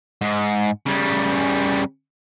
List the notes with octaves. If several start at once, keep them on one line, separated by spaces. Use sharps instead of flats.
G#2
C#3 G3